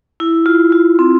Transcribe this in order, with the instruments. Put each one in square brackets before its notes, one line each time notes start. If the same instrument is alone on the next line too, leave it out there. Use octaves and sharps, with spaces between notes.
[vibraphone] E4
F4
F4
C4